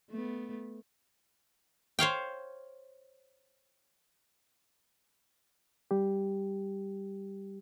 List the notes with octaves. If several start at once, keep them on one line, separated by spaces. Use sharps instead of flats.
A3 B3
C5 C#5 F5 G5
G3 G4